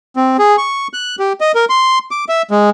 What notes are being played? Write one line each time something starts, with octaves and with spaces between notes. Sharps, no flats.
C4
G#4
C#6
F#6
G4
D#5
A#4
C6
D6
E5
G#3